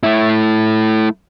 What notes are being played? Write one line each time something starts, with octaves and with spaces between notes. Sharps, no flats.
A3 E4